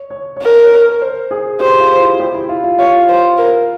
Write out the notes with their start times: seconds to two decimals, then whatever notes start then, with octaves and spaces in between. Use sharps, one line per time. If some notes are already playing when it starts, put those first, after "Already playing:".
Already playing: C#5
0.10 C#5
0.36 C#5
0.42 A#4
0.64 C#5
1.02 C5
1.31 G#4
1.60 G4 C5
1.80 F4
2.00 E4
2.20 G4
2.34 E4
2.49 F4
2.64 F4
2.78 F4 C#5
3.09 C5
3.38 A#4